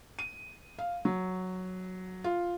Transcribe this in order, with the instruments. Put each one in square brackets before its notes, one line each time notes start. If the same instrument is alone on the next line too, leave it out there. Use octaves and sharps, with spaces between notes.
[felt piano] D#7
F5
F#3
F4